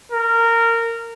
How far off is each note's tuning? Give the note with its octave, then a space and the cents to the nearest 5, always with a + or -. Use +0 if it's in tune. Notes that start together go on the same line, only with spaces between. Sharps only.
A#4 -20